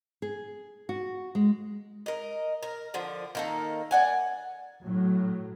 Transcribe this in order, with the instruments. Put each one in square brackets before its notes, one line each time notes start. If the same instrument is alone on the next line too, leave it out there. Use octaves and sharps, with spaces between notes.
[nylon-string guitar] G#4
F#4
G#3
[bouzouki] A#4 D#5
A#4
D3 F3
D#3 A#3 A4
D5 F#5 G#5
[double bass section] A2 F#3